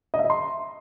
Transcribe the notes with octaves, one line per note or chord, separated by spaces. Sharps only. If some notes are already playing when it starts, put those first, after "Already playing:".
D#5
E5
D#5
C6